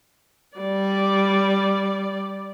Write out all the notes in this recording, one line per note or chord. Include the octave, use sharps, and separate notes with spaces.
G3 D5